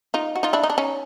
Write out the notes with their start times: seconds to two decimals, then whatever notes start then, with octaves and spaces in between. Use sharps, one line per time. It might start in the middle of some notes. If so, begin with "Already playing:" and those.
0.14 D#4 F4
0.36 F#4
0.43 D#4 F4
0.53 D4 E4
0.63 D#4
0.70 D4
0.78 C#4 D#4